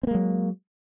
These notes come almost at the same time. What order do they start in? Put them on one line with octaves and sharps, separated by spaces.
C4 A#3 G#3 F#3